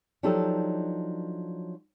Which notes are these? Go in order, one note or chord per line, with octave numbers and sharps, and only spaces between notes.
F3 F#3 D4 D#4 G4 A4